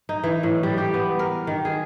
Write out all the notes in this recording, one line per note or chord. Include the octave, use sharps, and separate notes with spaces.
D#4
E3
A2
G3
G4
B3
A#4
D#3
G#4